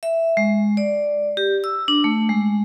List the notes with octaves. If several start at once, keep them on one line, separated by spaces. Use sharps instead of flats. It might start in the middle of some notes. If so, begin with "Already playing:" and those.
E5
G#3
D5
G4
E6
D4
A3
G#3